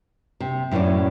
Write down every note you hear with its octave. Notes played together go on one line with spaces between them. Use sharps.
C3
F#2 A2 C#4 E4 D5